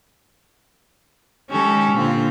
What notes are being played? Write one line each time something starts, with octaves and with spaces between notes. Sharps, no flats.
D#3 G#3 C#4 G4 A4
A#2 D3 C4 F4